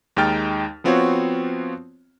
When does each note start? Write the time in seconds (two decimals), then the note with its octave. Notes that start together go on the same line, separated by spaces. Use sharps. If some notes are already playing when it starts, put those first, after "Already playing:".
0.17 D#2 G#3 D#4 G5 F6 A6
0.84 F3 B3 C4 F4 F#4 C#5